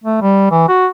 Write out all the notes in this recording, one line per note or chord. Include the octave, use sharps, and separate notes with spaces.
A3
G3
E3
F#4